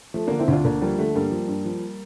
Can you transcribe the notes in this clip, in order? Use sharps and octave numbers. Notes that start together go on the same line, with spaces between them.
F3 A3
D3 A#3 D4
C4 E4
D2 D4 F4
D2 A#3 D4
F3 G3 A#3
D3 A3
G2 G3 A#3
F3
G2
F3